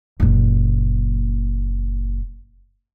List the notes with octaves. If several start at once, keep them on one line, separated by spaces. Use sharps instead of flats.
F#1 A#2